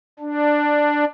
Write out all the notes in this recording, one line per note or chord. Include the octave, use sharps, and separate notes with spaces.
D4